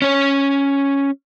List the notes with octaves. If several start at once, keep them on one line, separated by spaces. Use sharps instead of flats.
C#4 C#5